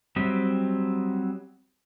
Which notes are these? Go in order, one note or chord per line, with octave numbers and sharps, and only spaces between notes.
F#3 G3 C4 D#5 E5